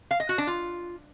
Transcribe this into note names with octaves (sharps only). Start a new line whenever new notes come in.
F5
D#5
F#4
D4
F4